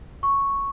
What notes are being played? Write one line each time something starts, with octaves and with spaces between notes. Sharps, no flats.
C#6